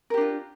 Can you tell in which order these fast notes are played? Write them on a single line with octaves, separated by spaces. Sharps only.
A#4 G4 D4 F4